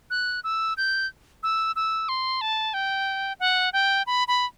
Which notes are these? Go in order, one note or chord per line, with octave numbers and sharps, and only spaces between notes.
F#6
E6
G6
E6
E6
C6
A5
G5
F#5
G5
B5
B5